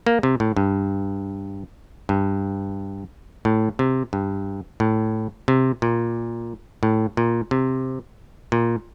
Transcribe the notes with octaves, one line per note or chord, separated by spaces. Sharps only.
A#3
C3
A2
G2
G2
A2
C3
G2
A2
C3
A#2
A2
A#2
C3
A#2